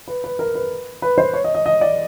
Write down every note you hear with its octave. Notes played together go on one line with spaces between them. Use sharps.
B4
B4
A#4
B4
B4
C5
C#5
D#5
D#5
D#5
D5